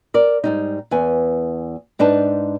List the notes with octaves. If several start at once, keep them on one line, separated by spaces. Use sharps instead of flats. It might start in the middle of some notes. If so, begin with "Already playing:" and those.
A#4 D5
G#2 G3 D#4
E2 B4 G#5
G#2 D4 D#4 B4 A5